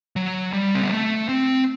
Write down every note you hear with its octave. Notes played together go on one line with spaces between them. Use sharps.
F#3
G3
C4
B3
A3
C4